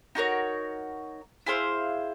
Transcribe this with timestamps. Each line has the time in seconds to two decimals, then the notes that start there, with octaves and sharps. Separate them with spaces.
0.15 D#4 F#4 A#4 C#5
1.46 E4 G#4 C5 F5